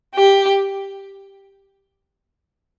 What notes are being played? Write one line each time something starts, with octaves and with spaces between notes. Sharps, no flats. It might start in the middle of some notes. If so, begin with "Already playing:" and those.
G4